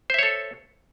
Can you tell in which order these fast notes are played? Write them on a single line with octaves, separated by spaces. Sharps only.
C5 E5 C#5 A4